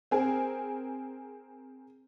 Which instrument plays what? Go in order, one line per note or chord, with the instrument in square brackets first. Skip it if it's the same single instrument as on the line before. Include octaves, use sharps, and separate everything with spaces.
[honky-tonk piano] C4 G#4 A#4